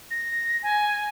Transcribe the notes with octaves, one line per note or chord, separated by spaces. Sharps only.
A#6
G#5